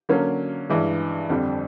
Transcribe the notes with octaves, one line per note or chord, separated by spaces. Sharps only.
D3 F#3 A#3 C#4
G2 E3 G#3
F2 D3 G3 C4